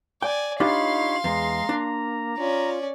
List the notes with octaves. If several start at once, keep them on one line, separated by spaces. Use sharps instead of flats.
D5 G5 G#5
D4 D#4 F4 G4 C#5 F5 B5 C6
E2 G#3 A#5
A#3 D4
C#4 F4 D5